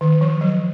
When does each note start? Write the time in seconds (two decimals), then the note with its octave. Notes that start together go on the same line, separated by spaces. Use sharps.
0.01 D#3
0.21 F3
0.41 F#3